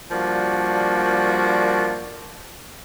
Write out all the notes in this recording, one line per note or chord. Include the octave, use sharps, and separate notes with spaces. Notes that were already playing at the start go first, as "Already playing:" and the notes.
F3 G3 A#3 D4 F#4